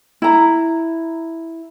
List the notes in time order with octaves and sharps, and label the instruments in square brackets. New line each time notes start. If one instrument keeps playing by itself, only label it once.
[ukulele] E4 A#5